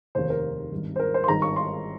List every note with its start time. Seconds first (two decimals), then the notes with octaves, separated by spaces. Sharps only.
0.15 F1 D#2 D#3 C5
0.30 A#4
0.71 G#1 G2 D#3
0.96 C5
0.99 A#4
1.14 C5
1.24 C6
1.28 G#1 G2 D#3 A#5
1.42 C#6
1.56 C6